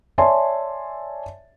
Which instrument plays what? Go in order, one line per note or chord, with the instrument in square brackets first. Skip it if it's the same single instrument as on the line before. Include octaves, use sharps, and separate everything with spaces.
[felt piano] C#5 D5 E5 G#5 A5 C6